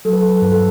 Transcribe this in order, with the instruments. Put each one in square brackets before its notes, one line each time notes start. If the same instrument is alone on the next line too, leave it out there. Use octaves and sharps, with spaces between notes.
[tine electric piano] F#3 [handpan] A4
[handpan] B4
A4
B4
A4
[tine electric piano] G2 [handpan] B4
[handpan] A4